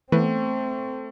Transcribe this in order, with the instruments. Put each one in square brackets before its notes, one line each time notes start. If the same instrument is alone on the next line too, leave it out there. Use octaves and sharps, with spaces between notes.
[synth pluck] E3 B3 [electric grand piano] A3 [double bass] C4